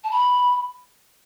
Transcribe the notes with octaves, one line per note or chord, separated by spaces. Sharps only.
A5
B5